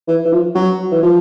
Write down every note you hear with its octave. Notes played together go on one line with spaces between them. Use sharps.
E3
E3
F3
F#3
E3
F3